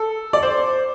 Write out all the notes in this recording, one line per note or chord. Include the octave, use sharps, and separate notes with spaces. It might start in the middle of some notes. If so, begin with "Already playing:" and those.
Already playing: A4
D5
C5